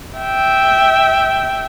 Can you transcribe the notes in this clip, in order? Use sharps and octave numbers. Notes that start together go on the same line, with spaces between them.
E5 G5